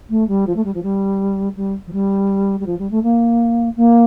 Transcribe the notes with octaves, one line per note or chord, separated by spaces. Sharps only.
A3
G3
F3
A3
G3
F3
G3
G3
F3
G3
G3
F3
G3
A3
A#3
A#3